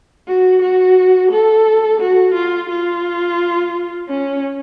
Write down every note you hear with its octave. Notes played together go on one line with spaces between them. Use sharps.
F#4
F#4
A4
F#4
F4
F4
C#4